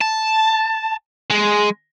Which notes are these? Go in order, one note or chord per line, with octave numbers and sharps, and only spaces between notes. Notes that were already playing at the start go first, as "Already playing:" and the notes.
A5
G#3